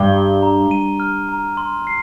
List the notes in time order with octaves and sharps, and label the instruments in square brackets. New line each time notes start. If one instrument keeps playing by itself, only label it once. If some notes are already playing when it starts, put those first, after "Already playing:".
Already playing: [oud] G2 [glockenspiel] G7
[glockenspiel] A#5
A#5
D#7
F6
A#5
C6
C7